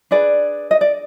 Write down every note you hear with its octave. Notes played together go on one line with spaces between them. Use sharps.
D4 G#4 B4 D5
D#5
D5